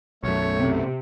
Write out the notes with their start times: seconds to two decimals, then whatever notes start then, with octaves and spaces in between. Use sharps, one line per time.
0.24 B1 F#2 A3 C#5
0.57 C3